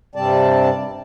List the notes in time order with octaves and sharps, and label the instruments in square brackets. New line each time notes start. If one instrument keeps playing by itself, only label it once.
[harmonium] G2 C3 G3 C4 D5 A5